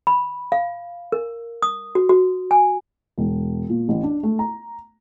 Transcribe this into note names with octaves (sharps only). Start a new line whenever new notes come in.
B5
F5
A#4
D#6
F#4
F#4
G#5
E1
A#2
A1
D4
A3
A#5